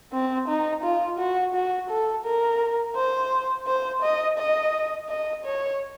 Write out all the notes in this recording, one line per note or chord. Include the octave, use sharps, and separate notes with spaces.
C4
D#4
F4
F#4
F#4
A4
A#4
C5
C5
D#5
D#5
D#5
C#5